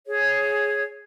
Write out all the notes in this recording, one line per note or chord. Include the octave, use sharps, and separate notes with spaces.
G#4 C#5